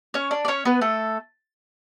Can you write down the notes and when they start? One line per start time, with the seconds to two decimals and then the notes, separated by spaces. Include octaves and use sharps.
0.14 C#4 C#5
0.31 D4 D5
0.45 D5
0.48 C#4 C#5
0.65 B3 B4
0.81 A3 A4